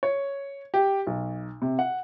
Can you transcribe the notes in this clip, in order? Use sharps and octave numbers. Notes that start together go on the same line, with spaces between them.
C#5
G4
B1
C3
F#5